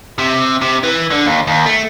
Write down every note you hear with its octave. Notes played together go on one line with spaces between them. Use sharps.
C3
C3
E3
D3
D#2
D#2
A3